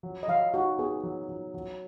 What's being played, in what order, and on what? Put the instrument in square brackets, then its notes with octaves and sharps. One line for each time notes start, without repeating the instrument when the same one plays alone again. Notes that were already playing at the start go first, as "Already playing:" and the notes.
[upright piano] F#3
[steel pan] D#5
[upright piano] F#3 [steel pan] F5
[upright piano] D#4 [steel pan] F#4
[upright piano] B3 [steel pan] G#4
[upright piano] F#3
F#3
F#3